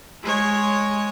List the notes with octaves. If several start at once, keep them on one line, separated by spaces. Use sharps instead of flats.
G#3 C#5